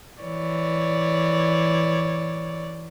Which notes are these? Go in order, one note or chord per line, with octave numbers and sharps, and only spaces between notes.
E3 C#5 D5